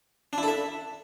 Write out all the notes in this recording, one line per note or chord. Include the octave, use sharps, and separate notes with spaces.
D4
E4
A4
E5